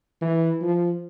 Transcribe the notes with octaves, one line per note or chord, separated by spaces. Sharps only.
E3
F3